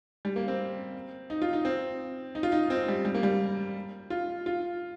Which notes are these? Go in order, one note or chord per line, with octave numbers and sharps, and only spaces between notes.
G3
A#3
C4
D#4
F4
D#4
C4
D#4
F4
D#4
C4
G3
G3
A#3
G3
F4
F4